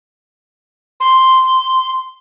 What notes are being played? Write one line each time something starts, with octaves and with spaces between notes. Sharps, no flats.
C6